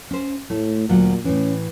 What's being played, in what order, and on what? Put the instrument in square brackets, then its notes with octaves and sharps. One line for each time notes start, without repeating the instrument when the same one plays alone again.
[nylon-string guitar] C#4 C5
[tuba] A2 [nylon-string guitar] A3
[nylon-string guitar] D2 F#3 F4 [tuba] A#2
[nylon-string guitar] A2 E3 [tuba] C#4